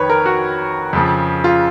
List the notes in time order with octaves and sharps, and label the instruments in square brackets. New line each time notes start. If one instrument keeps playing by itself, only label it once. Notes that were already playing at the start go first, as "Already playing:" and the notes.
Already playing: [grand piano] F2 D#3 B4 C#5
A#4
F#4
F2 C#3 F3
F4